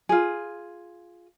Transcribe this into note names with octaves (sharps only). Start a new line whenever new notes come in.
F4 G#4